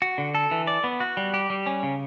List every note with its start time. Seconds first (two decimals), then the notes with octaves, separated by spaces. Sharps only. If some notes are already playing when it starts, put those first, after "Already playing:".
0.02 F#4
0.18 D3
0.35 A4
0.51 E3
0.67 D5
0.84 B3
1.00 F#4
1.17 G3
1.34 G4
1.50 G3
1.66 C#4
1.83 C#3